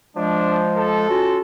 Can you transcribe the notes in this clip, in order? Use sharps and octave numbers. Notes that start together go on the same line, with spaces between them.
F3 G#3 D4
A4
C#4 F4 F#4